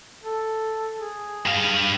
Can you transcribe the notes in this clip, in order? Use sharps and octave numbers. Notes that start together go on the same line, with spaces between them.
A4
G#4
G2 F5